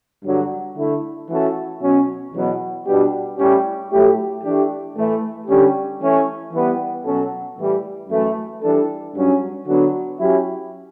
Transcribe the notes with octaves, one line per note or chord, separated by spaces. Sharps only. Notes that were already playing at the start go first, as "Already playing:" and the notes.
G2 D3 F#3
D3 A3 E4
E3 A3 C#4 F#4 A4
B2 F#3 C#4
E2 B2 F#3 B3
B2 G3 B3 D4 G4
A2 G3 C#4 E4 G4
A2 F#3 A3 E4 G4
E3 A3 D4 G4
A2 E3 A3
D3 G3 C#4 G4
E3 A3 C#4
E3 G3 B3
B2 F#3 C#4 F#4 A4
A2 E3 G3
F#2 E3 A3
E3 G3 D4 A4
G2 F#3 C#4
D3 F#3 B3 D4 F#4
F#3 C#4 E4 G4